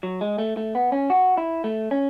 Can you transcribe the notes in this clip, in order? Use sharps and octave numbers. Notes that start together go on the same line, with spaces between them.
F#3
G#3
A3
A3
B3
C#4
F#4
E4
A3
C#4